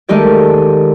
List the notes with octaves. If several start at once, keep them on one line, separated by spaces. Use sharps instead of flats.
D#3 G#3 A3 D#4 G4 D5